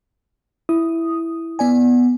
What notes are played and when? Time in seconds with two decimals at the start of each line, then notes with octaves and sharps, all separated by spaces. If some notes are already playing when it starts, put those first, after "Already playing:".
0.69 E4 D#6
1.59 B3 D5 G#5